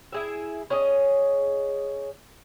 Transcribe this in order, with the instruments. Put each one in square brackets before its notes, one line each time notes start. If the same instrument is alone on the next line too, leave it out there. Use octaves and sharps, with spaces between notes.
[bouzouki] E4 G#4 E5
C#4 G#4 D#5